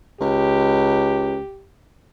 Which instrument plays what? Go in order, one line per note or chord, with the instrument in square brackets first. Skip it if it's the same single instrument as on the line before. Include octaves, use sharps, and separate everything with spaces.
[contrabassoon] C#2 [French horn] G4